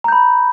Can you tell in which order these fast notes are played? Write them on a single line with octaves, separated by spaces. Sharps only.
A#5 G6 B5